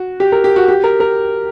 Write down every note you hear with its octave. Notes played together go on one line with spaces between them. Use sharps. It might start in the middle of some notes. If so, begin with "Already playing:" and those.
Already playing: F#4
G4
A#4
G4
F#4
G4
A#4
A#4